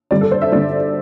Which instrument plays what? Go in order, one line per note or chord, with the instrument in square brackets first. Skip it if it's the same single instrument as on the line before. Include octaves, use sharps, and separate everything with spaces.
[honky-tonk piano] G2 D3 G3 D5
A4
C5
E5
G2 D3 G3 D5